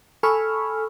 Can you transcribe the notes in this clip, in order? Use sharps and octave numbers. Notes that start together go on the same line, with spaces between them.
A4 G#5 B5 C#6 E6 F6